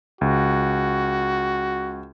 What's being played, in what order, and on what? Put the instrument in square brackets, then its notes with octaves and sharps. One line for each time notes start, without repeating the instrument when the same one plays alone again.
[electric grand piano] C#2 [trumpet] F#4